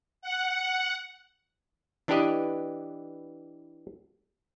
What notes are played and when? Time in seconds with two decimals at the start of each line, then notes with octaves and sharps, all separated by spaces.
0.22 F#5
2.08 E3 D4 E4 G4 B4 D#5